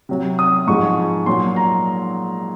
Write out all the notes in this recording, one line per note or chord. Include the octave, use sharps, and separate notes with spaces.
C3 F#3
D#6
G#2 F3 G#3 C#6
A#2 F#3 C6
A#5